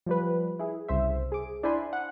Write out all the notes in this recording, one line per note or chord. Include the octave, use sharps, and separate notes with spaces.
F3 G3 B4
E4 G#4
C2 C#3 C5 E5
G#4 D6
D4 E4 C5 G#5 B5 C6
F#5